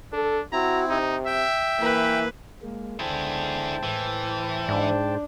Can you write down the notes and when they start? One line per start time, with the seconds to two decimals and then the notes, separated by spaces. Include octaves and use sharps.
0.13 D4 A4
0.52 C4 E4 F#4 A#5
0.89 C3 D#4
1.26 E5 G5
1.79 E3 A#3 B4
2.62 G#3 A#3
3.00 C#2 D3 E4 G#4 C5 G5 A5
3.83 A2 E3
4.69 G#2 D4